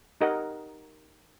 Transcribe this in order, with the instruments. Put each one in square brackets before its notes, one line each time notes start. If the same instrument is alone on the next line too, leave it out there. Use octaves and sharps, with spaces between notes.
[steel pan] D#4 G4 A#4 D#5 F#5